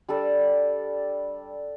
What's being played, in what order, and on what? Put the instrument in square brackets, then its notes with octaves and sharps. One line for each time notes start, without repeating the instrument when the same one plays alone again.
[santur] G3 D4 A4 D5